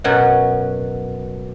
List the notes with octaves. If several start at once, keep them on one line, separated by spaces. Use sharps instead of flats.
F#2 B2 F#3 C#4 F#5